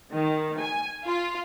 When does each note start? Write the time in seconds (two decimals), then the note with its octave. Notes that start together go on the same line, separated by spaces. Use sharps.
0.12 D#3
0.59 G#5
1.06 F4